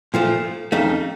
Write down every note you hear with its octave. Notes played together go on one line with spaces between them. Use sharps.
A#2 F3 A3
F2 C#3 A3 D#4